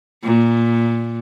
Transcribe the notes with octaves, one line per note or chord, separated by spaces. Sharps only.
A#2